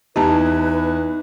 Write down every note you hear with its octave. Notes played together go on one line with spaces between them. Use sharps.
E2 D#4 E4 G4 B4 A5 A#5